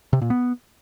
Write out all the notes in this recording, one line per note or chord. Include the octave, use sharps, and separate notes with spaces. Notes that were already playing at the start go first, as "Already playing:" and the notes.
C3
A#2
B3